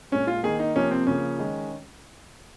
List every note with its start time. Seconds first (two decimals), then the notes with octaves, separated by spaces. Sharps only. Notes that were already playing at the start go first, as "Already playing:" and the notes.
0.12 A#2 G#3 C#4
0.27 F4
0.43 D#3 A#3 G#4
0.59 D#4
0.76 C3 F3 A#3 C#4
0.91 C4
1.07 C#3 F3 A#3 C#4
1.39 D#3 G#3